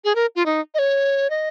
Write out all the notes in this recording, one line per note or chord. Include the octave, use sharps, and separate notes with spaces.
G#4
A#4
F4
D#4
D#5
C#5
D#5